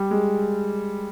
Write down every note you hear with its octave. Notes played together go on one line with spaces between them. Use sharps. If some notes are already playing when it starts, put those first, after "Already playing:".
Already playing: G3
G#3